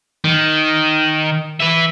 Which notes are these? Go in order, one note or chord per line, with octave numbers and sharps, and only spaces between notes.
D#3
B4 E5